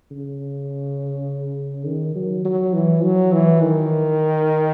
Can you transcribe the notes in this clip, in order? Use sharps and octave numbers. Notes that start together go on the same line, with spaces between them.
C#3
D#3
F#3
F#3
E3
F#3
E3
D#3